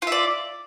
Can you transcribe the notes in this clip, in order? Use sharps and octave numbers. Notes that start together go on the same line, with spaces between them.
F4 D5 E5